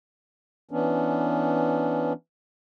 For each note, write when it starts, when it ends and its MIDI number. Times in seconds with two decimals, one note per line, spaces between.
0.71 2.13 52
0.71 2.13 59
0.71 2.13 61
0.71 2.13 62